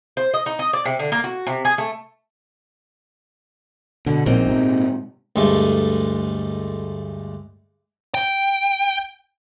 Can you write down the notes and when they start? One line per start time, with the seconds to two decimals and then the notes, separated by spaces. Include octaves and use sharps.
0.17 C5
0.34 D#5
0.46 D#4
0.59 D#5
0.73 D5
0.85 C3
0.99 D3
1.12 A#3
1.24 F#4
1.47 C3
1.65 G#4
1.78 A3
4.06 B2 D3
4.26 A#1 A#2 C4 D#4
4.46 G#2 C3
5.36 D2 G2 G#3 A3
8.15 G5